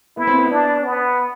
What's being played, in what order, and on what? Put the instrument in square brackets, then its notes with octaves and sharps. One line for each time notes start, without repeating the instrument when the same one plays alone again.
[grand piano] B3 [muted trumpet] E4
[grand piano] C4
B3
[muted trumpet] D4
B3